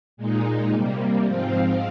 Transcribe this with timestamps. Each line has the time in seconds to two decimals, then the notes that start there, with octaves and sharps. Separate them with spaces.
0.17 A#2 G#3 D#4
0.71 C3 G3 A#3
1.25 G#2 F3 C4 F4